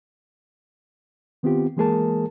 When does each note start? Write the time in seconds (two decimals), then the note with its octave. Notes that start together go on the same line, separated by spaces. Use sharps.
1.43 D#3 B3 C4 F4 G4
1.77 E3 G#3 A#3 G#4 A#4 A5